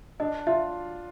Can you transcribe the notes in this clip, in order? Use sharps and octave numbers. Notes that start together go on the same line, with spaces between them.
D4 D#5
F4 E5